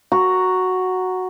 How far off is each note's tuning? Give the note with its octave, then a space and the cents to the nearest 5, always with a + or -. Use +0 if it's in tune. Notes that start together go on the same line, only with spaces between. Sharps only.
F#4 +0 A#5 +0